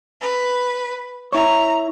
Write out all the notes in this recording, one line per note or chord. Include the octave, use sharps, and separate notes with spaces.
B4
E4 C#5 A#5